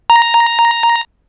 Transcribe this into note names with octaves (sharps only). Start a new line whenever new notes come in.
A#5